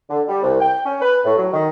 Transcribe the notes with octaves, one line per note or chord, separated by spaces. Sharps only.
D3
G3
C2
G5
C#4
B4
A2
F#3
D#3